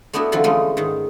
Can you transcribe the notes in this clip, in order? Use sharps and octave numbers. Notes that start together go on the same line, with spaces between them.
A3 B3 D4 E4 F#4
D3 E3 F#3 C4 F4
D3 E3 F3 G#3 A3 C#4
G#2 D#3